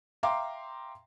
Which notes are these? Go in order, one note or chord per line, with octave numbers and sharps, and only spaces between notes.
E5 F5 G5 A#5 C6 D6